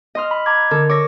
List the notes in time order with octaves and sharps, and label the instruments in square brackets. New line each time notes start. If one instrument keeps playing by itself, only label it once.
[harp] D#5 C6 F6
[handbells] B5
A#5 D6 G#6
[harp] D3 A4 [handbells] A#4
[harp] C#5 E6 [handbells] D6 A#6